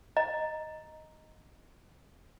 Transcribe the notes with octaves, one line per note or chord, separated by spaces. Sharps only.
D#5 A#5